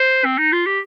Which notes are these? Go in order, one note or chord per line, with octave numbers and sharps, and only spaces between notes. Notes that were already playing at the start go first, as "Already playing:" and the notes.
Already playing: C5
C4
D#4
F4
G4